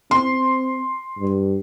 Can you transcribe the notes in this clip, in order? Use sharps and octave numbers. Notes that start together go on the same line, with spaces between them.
C4 C6
G2